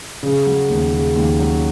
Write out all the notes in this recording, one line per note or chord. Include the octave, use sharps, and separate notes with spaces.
C#3
F#3
D#2
C#3
D#2
F#3